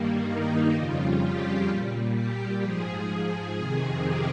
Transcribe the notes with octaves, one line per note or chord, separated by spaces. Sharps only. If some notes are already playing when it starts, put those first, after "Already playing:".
Already playing: G2 D#3 G3 A#3
D#4
F2 C#3 G3 F4
G4
A#2 G3
G4
G#2 F3 G#4
F2 C3 D#3 G#4
G4